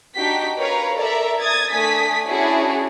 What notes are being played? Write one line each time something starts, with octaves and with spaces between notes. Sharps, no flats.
D4 D#4 F#4 G4 G5 B6
A#4 B4 C#5 F5 A#5
A4 A#4 D5 E5 A#5
D#6 G#6 A6
A3 D4 G#5 D#6 B6
C#4 D4 E4 F#4 G#4 C#5